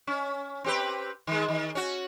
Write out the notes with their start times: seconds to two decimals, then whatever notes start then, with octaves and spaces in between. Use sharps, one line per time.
0.07 C#4
0.64 C4 G4 B4
1.27 D#3 G#3
1.48 D#3
1.75 C#4 F#4